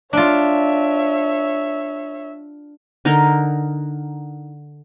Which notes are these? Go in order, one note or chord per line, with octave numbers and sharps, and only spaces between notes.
D4 F4 C#5 E5
D3 D#4 A#4 A#5